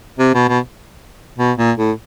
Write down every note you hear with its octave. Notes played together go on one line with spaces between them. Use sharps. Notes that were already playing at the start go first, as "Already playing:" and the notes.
C3
B2
B2
B2
A#2
A2